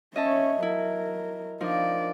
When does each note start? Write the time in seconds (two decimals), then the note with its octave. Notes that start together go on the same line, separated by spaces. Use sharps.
0.16 C#4 C#5 D#5 E5 A5
0.63 F#3 E4 A#4
1.61 F3 D4 D#4 A#4 D5